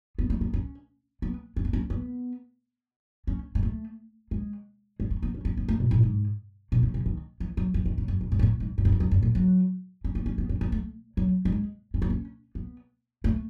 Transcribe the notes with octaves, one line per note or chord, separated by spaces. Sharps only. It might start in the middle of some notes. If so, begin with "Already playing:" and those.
B3
A3
B3
C#4
B3
C#4
B3
C#4
B3
C#4
G#3
A3
G#3
G#3
A3
B3
C#4
C#4
B3
A3
B2
A2
G#2
B2
C#3
C#3
D#3
E3
F#3
E3
D#3
C#3
F#2
F#2
G#2
B2
A2
G#2
G#2
F#2
E2
F#2
F#2
A2
F#3
C#4
B3
C#4
B3
C#4
B3
A3
F#3
F#3
G#3
C#4
B3
C#4
B3
A3